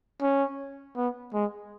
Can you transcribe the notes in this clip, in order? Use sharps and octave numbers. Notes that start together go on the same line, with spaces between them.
C#4
B3
G#3